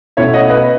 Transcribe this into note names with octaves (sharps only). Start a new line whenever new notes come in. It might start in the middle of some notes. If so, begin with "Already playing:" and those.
B2 A3 C#4 E4 C#5 E5
D#5 F#5
B4 D#5